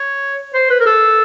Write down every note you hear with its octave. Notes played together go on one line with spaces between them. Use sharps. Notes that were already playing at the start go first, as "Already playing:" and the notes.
Already playing: C#5
C5
B4
A#4
A4